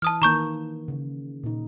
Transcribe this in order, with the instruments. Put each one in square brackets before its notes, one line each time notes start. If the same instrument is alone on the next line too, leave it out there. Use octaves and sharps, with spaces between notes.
[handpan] E3 [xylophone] A5 D#6 F6
[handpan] D#3 A#3 [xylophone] A#5 C#6 G6
[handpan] C#3
A#2 D#4